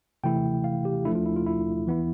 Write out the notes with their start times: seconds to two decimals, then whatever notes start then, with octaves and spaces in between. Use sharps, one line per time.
0.24 C3 E3 A3 E4 G5
0.64 F5
0.85 G4
1.05 F3 A3 D4 E4
1.15 F4
1.26 E4
1.36 F4
1.46 E4
1.87 E3 B3 E4